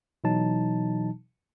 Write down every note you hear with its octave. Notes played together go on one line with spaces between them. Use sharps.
B2 E3 F#3 D#4 A5